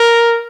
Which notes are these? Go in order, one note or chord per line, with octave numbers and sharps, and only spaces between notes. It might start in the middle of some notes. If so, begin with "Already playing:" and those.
Already playing: A#4